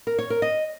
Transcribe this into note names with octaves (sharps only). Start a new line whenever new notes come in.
A#4
C#5
A#4
D#5